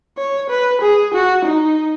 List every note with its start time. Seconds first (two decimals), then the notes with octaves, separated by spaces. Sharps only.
0.18 C#5
0.50 B4
0.82 G#4
1.14 F#4
1.45 D#4